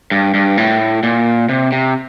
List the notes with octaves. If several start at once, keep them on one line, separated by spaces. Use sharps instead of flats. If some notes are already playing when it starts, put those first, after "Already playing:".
G2
G2
A2
A#2
C3
C3